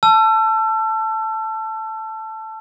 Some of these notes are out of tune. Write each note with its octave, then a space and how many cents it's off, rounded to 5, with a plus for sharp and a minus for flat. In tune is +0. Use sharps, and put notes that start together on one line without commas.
A5 +0 E6 +35